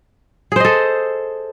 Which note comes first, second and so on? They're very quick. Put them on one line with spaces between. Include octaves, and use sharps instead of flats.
G#4 C5 D#5 A4